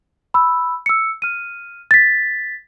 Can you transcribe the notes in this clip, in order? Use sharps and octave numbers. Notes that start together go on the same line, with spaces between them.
B5 E6
E6 C#7
F6 D#7
A6 B6